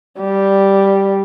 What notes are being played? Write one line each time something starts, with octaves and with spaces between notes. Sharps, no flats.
G3